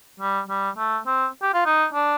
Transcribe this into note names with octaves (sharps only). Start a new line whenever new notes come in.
G3
G3
A3
C4
G4
F4
D#4
D4